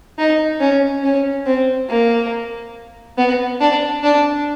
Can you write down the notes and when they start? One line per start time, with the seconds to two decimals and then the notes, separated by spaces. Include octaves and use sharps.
0.18 D#4
0.60 C#4
1.03 C#4
1.46 C4
1.89 A#3
3.18 B3
3.61 D4
4.03 D4